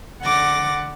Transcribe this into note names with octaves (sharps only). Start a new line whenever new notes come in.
D3 F#5 D6 A6 A#6